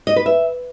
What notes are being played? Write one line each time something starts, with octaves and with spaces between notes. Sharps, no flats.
D#5
B4
E5